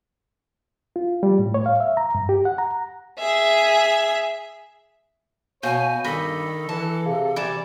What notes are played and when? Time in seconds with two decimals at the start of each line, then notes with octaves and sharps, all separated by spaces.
0.96 F4
1.23 G3
1.39 A2
1.54 C#5
1.66 F5
1.80 E5
1.97 A#5
2.15 G2
2.29 G4
2.45 F#5
2.58 A#5
3.19 G#4 E5
5.63 B2 C#5 F5 G#5 G6
6.04 G2 D#3 A4 B5 A#6 B6
6.69 E3 A5
7.06 C3 G#4 F5
7.36 C3 E3 G3 D5 B5 E7